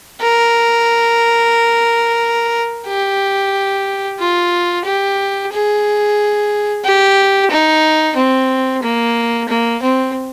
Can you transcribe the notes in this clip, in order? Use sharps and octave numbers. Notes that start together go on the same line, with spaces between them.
A#4
G4
F4
G4
G#4
G4
D#4
C4
A#3
A#3
C4